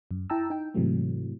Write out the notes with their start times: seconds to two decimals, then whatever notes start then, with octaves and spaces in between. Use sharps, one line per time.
0.11 F#2
0.30 E4 G5 A5 A#5 E6
0.50 D#4 G5
0.74 G#2 C3 E3 F#3 A3